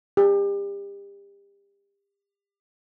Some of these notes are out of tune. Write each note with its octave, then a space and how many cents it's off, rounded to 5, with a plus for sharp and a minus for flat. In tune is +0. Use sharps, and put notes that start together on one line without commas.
G4 +30